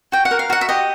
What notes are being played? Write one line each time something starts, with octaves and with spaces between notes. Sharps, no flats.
F#4 G5
F#5
A#4
F5
F#4 F#5
E5
G4 D#5